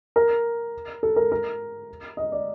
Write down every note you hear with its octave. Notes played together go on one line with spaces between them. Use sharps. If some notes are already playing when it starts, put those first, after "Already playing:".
A#4
A4
A#4
A#4
D#5
D5